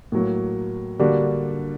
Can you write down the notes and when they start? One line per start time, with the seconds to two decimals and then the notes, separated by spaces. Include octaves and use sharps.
0.12 A2 F#3 A#3
0.99 D3 G3 A#3 D4 F#4